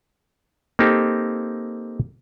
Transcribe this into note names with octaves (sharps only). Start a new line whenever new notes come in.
A#3 C4 D#4 G4 A4